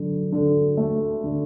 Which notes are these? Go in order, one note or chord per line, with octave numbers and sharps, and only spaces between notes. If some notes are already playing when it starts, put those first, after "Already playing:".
Already playing: D3 F#3
D3
A3
D3